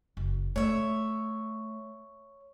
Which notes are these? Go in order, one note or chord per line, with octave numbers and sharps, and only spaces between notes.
F#1
A3 C#5 E5